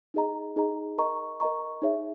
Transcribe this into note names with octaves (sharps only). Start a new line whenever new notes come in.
D#4 G#4 D#5 A#5
D#4 G#4 D#5 A#5
A#4 D#5 A#5 C#6
A#4 D#5 A#5 C#6
D#4 G#4 C#5 E5